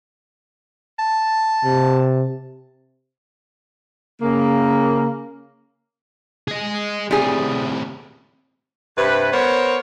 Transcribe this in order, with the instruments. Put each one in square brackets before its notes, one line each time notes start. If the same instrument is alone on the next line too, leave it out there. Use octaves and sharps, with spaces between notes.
[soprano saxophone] A5
[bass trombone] C3
[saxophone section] C#3 A#3
[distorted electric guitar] G#4 D#5
[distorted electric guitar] A2 C3 [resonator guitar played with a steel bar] G3 G#4
[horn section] G2 C3 B4
B3 A#4 C5 C#5